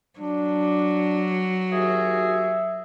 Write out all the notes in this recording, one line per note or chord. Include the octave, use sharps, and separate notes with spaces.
F#3 D4
D#2 F#4 G#4 E5